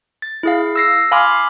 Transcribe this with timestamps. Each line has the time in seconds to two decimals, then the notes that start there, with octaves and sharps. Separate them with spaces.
0.22 A6
0.43 E4 G#4 F5
0.76 E6 A#6 C7
1.11 F5 G#5 B5 C6 D6 F6